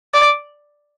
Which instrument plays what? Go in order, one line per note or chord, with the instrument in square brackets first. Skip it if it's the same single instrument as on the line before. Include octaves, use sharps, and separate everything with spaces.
[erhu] D5